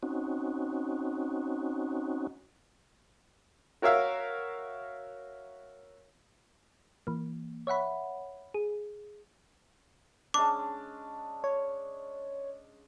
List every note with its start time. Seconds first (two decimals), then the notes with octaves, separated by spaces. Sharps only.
0.03 C4 C#4 D#4 F#4
3.82 F#4 A#4 C#5 E5 F5 E6
7.07 E3 A#3
7.67 C#5 E5 F#5 B5
8.54 G#4
10.34 G#3 C#4 D4 D6
11.44 C#5